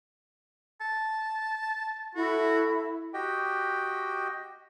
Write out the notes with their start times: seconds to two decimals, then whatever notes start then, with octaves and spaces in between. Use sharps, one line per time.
0.81 A5
2.15 E4 F#4 A4
3.14 F#4 G4 D#5 G5